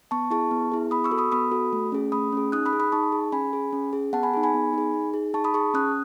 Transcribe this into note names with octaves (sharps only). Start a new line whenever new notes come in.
B3 A5 C#6
E4 G#4 A5 C#6
B3
E4 G#4
B3 B5 D#6
C#6 E6
F#4 A4
B5 D#6
B3 B5 D#6
F#4 A4
A3
C#4 G#4
A3 B5 D#6
C#4 G#4
D#4 D#6 F#6
B5 D#6
G#4
B5 D#6
D#4 A5 C#6
G#4
C#4 G#5 B5
G#4
C#4
G#4
B3 F#5 A5
G#5 B5
D#4 G#4
G#5 B5
B3
D#4 G#4
D#4
G#4
D#4 A5 C#6
B5 D#6
G#4 A5 C#6
C#4 D#6 F#6